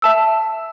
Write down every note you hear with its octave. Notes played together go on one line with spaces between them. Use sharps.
E5 A5 E6